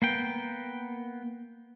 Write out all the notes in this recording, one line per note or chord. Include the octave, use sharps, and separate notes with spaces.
A#3 B3 G5